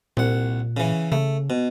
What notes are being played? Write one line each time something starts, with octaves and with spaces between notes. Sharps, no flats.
C2 A#2 F#5
C#3 E3
C#3 A3
B2